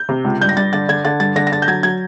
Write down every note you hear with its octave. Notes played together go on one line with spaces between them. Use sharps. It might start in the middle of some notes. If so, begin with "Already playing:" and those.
Already playing: G6
C3
C#2
G2 G6
A#6
G2 A6
D3 A6
D3 G#6
D3 A6
G2 A6
D3 A#6
A#6
D3 A6
G6
F#3 G#6
F#3 G#6